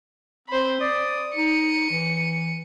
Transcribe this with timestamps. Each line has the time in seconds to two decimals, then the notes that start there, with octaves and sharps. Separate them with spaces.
0.48 C4 C5 B5
0.81 D5 D#6
1.36 D#4 C#7 D#7
1.91 E3